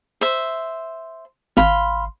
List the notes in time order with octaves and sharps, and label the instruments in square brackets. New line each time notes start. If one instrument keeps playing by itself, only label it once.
[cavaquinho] C5 E5
[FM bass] G#1 [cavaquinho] F5 B5 C6